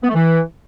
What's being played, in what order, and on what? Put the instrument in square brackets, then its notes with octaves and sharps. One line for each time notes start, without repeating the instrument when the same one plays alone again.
[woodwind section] B3
A3
E3